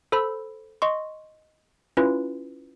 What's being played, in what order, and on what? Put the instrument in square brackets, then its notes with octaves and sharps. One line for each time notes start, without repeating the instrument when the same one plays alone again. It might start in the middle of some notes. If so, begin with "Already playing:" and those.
[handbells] A4 C5 B5 E6
D#5 C6 C#6
C#4 E4 F4 B4